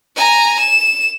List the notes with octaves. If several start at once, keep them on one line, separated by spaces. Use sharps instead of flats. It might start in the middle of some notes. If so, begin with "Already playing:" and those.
G#5 A#5
E7